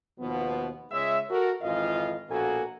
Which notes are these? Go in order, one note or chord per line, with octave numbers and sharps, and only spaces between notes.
D#2 B2 F3 B3
C#2 G#3 C#5 E5
F#4 A4 A#4
G#1 F2 E3 F4 D#5 F5
A#1 B2 A#3 F#4 A4 G#5